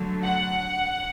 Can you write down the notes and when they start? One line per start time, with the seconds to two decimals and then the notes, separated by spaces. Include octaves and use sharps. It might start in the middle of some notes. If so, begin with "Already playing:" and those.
Already playing: D3 F#3 A3
0.24 F#5